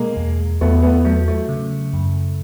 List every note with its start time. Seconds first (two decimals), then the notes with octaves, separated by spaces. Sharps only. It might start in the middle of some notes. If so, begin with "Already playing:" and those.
Already playing: B2 G#3 A#3
0.17 E2
0.61 E2 A3 B3
0.83 A3 B3
1.05 F#3 A3
1.28 A3
1.49 C#3
1.93 F#2